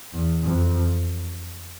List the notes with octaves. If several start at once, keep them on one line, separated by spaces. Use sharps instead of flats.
E2
F2